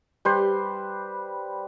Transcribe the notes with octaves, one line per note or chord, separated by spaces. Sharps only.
G3 B4 C5